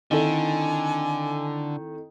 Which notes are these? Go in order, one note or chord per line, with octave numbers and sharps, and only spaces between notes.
D3 D#3 C4 E4 A4 G#5